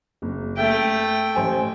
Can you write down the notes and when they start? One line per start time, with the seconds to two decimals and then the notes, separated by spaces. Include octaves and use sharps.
0.22 F#1
0.57 A3 E5 G5
1.35 A1 C5 G#5